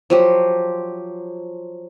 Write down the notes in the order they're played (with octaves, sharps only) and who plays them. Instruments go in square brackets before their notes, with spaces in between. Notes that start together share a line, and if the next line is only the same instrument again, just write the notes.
[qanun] F3 F#3 G4